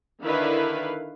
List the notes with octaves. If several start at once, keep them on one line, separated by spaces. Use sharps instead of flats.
D3 D#3 D4 E4 B4 F5